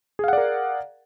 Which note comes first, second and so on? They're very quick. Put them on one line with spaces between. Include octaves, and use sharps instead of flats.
G#4 F5 F#5 D5 A#4